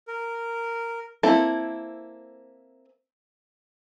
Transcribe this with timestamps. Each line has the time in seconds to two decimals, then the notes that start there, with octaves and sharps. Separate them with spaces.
0.08 A#4
1.23 A#3 C4 E4 A4